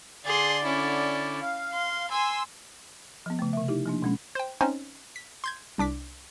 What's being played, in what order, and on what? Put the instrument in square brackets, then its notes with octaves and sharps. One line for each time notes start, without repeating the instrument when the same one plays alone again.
[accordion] D3 D5 [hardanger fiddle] G#4 C6
[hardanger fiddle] C#4 E4
[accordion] F5
[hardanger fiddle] C6
[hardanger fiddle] G#5 [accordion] C6 E6
[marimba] F3 B3
C#3 A3
C3 E5
D#4 E4 G4
F3 A#3 D4
B2 G#3 C#4
[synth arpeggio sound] C5 G5
C4 C#4 D#4 C5 G#5
B6
C6 G6 G#6
C2 D4 D6 B6